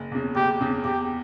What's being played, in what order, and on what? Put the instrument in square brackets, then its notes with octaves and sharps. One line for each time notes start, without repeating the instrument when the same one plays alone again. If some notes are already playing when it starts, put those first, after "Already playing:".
Already playing: [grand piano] F#1
E2 C#3
[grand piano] F#1 [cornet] G4
[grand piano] E2 C#3
[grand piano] E2 [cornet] G4